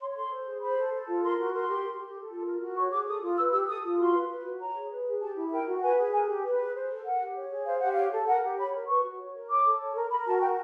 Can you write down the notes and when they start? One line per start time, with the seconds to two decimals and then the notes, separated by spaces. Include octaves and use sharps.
0.01 C#5 C6
0.15 A4 C6
0.32 C5
0.46 G#4
0.61 C5 B5
0.76 A4
0.93 A4
1.07 F4
1.23 A#4 C6
1.38 F#4
1.53 A#4 C6
1.68 G4
1.84 A#4
1.99 G4
2.14 A4
2.29 F4
2.45 A#4
2.61 F#4
2.76 C#5 C#6
2.92 G#4 D6
3.07 A4 D#6
3.22 F4
3.37 B4 E6
3.52 G4 E6
3.68 A4 D#6
3.84 F4
3.99 F#4 C6
4.13 B4
4.29 B4
4.44 F#4
4.59 C#5 A#5
4.74 G#4
4.91 B4
5.06 G#4
5.20 G4 A5
5.36 E4
5.51 A#4 G5
5.67 F#4
5.82 B4 G#5
5.97 G#4
6.12 A#4 G#5
6.28 G4
6.43 B4
6.58 G#4
6.74 C5
6.90 A4
7.05 A#4 F#5
7.20 G4
7.36 C#5
7.50 G#4
7.65 C5 F5
7.80 G4 F#5
7.93 C#5 F5
8.12 A4
8.28 A#4 F#5
8.42 G4
8.58 C#5 B5
8.72 A#4
8.88 B4 C#6
9.03 F#4
9.18 C#5
9.34 A#4
9.49 C#5 D6
9.64 A4
9.79 C#5
9.95 A#4
10.10 A#4 B5
10.26 F#4 A5
10.41 A#4 G5